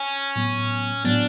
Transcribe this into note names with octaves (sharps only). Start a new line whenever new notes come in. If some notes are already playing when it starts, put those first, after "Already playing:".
Already playing: C#4
A2 F#3 B3
A2 F#3 B3 D4